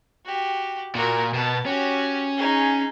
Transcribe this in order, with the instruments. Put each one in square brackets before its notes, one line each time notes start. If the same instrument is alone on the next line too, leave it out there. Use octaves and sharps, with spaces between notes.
[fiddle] F#4 G4
[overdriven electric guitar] A#2 [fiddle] F#4 A#4
[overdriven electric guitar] B2 [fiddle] B3 A5
[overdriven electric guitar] C#4 [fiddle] F#4 G4
[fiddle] D#4 G#4